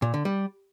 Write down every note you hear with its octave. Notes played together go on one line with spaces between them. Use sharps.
A#2
D3
G3